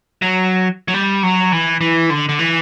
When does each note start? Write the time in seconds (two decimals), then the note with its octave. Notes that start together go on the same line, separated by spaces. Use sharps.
0.22 F#3
0.88 F#3
0.94 G3
1.23 F#3
1.52 E3
1.81 E3
2.10 D3
2.29 D3
2.39 E3